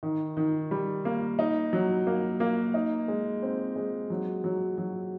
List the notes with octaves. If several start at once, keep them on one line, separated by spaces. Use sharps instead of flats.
D#3
D#3
G3
A#3
D#4
F#3
A#3
A#3
D#4
G#3
C4
G#3
F#3
F#3
F#3